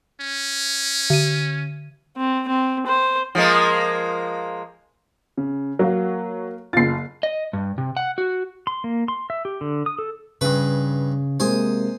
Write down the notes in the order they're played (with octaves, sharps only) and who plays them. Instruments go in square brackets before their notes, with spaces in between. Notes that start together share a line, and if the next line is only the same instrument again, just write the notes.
[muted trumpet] C#4
[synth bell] D3 D#7
[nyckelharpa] C4
C4
C5
[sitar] F3 G#3 A#3
[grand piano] C#3
[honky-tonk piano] F#3 [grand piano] A#3 F#4 F5
[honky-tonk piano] F#1 F4 [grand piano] A6 C7
[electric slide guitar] D#5
G2
C3
F#5
F#4
[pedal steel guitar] C6
A#3
C6
E5
G4
D3
D#6
A4
[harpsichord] G2 B4 [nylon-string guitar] C#3
[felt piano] C3 G#3 A#3 [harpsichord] C5 G#5 D#6